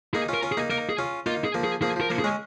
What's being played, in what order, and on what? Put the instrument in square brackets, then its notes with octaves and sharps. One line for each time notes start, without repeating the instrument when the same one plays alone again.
[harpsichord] A#3 D#4 [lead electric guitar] G#4
[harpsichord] C#4 F4
[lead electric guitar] A#4
[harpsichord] C#4 F4
[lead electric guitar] G#4
[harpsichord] A#3 D#4
[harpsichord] A#3 D#4 [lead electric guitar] A#4
[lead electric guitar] G#4
[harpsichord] C#4 F4
[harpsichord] A#3 D#4 [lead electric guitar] F4
[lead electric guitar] G#4
[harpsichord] F3 A#3
[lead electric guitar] G#4
[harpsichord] F3 A#3 [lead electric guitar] G#4
[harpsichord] F3
[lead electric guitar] A#4
[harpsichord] F3 A#3
[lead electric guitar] G#4
[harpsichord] G#3 C#4